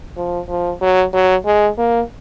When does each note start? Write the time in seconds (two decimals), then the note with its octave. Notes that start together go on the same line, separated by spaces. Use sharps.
0.17 F3
0.49 F3
0.81 F#3
1.13 F#3
1.46 G#3
1.78 A#3